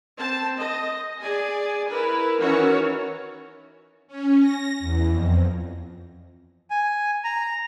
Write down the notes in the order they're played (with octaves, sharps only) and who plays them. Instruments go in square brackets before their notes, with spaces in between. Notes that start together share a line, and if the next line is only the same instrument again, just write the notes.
[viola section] C4 A5
D#5
G#4 D5 G#5
E4 A#4 B4
D#3 E3 C#4 F#4 A#4 C#5
[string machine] C#4
A#6
E2
F2
[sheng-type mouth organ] G#5
A#5